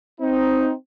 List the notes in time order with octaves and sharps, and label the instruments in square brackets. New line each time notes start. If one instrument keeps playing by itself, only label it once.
[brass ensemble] C4 D#4